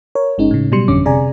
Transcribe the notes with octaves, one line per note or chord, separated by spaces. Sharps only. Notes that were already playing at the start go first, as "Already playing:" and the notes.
A#4 C#5
G1 G#3 C#4 D#4
A2 C#3
B2 F#3 G3 C6 C#7
G1 F2 D3 C#4 D6
C3 G#4 D5 G#5 A#5